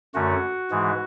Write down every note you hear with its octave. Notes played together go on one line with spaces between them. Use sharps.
F#2 D3 A3 C#4 F#4
G#2 E3 G#3